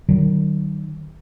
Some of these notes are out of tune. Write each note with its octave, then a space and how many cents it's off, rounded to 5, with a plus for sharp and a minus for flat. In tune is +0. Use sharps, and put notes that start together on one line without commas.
D#3 -25 F#3 +40